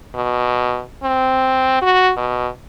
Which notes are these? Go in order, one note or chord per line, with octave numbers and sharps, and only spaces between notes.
B2
C4
F#4
B2